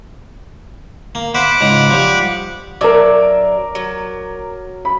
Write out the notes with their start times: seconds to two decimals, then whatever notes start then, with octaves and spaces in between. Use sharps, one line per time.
1.15 A#3
1.35 C5 E5 F#5 B5 D6
1.61 C#2 G#2 A#5
1.90 F3 G3
2.81 F#3 D4 A#4 E5 D6
3.75 F#3
4.85 B5